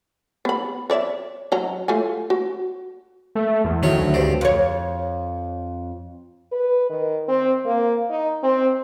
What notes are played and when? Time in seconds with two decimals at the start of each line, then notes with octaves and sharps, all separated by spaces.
0.45 B3 B5
0.90 C#5 D5 E5
1.52 F#3 D#5 A#5
1.88 A3 F4 G#5
2.30 F#4
3.35 A3
3.65 E2
3.83 D#3 F#3 A3 C#5
3.98 D2
4.14 C#2 G2 C4
4.41 F2 C#5
6.52 B4
6.90 D#3
7.28 C4
7.66 A#3
8.10 D#4
8.43 C4